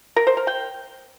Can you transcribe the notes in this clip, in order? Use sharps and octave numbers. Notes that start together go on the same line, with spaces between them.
A#4
C5
A#4
G5